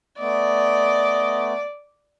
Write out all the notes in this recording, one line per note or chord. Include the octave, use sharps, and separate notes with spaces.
A3 B3 D5 D#5